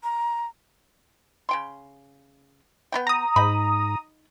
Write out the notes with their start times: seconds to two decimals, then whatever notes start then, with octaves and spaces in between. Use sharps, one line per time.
0.03 A#5
1.49 C#3 G5 C6
2.92 B3 D#4 G5
3.07 A#5 D#6
3.36 G#2 D#4 B5